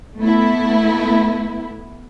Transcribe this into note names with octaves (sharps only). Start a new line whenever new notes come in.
A3 B3 E4